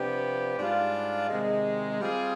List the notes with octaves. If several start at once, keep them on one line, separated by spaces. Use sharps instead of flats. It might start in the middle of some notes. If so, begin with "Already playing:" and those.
Already playing: C3 F3 B3 D4 G4
G#2 G3 D4 F4
C3 D#3 G#3
G3 C4 F4 G#4